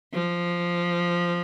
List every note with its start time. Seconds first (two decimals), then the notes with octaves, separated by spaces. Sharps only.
0.13 F3